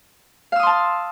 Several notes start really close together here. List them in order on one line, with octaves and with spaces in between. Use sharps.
F5 E6 D#6 C6 A5